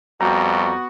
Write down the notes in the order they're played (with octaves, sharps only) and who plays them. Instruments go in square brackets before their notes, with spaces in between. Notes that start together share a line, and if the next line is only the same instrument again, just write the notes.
[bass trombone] F2 [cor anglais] G3 [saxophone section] B3 F#4 [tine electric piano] A#5